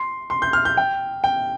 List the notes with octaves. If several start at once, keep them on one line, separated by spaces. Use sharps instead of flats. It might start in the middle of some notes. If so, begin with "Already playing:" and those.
Already playing: C6
C6
G6
F6
G6
G5
G5